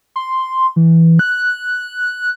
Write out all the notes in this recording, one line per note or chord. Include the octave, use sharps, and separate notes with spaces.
C6
E3
F#6